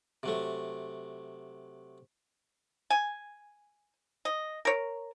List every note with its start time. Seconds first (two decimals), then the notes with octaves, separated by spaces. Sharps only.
0.23 C3 F#3 A3
2.90 G#5
4.25 D#5
4.65 A#4 C#5